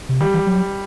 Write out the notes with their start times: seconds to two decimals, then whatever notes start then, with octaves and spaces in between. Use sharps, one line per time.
0.09 C3
0.21 D#3 G3
0.34 E3
0.47 F#3